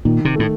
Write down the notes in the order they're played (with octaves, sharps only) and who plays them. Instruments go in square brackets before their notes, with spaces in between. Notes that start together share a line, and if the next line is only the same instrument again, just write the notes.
[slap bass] A#2 [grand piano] D#3
[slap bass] C3
[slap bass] A2 [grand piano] A3